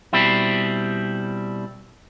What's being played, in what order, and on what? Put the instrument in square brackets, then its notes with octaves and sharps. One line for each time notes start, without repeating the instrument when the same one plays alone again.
[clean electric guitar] B2 G3 C4 E4